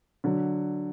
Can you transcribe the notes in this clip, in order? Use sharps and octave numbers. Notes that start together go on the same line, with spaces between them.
D3 F#3